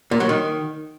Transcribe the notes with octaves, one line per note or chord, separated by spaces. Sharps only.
A#2
F#3
D#3